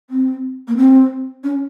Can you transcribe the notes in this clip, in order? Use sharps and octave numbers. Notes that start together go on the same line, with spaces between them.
C4
A#3
C4
C#4